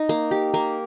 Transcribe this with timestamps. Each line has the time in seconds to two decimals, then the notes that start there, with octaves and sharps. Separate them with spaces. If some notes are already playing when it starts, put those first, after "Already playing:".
Already playing: D#4
0.09 A#3
0.31 G4
0.54 A#3